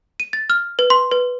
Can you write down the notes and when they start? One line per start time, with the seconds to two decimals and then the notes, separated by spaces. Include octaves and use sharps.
0.20 D#7
0.33 A6
0.50 F6
0.79 B4
0.90 C6
1.11 B4